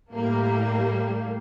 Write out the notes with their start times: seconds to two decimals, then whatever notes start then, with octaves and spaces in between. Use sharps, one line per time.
0.13 A2 G3 A#3